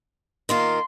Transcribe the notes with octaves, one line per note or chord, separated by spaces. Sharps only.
D#3 A#3 F4 C6